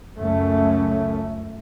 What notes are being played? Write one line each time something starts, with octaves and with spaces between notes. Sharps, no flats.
C#2 F#2 C#3 A3 C#4